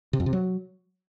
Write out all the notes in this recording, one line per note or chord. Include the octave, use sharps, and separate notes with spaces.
C3
F2
C3
F#3